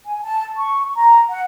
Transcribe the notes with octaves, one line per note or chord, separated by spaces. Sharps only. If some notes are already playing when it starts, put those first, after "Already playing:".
G#5
A5
C#6
A#5
F#5